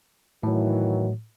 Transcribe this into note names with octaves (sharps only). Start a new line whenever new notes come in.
A2 D#3 E3 F#3